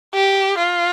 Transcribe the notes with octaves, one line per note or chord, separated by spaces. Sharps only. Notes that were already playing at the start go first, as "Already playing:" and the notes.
G4
F4